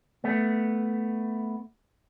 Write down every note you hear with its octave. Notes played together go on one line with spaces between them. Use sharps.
A3 B3